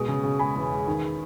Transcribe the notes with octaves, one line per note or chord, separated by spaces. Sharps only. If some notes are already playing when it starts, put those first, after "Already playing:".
Already playing: B2 G#3 D#6
C#3
C#3
G#3 G#5 B5
E2
G#3
D#3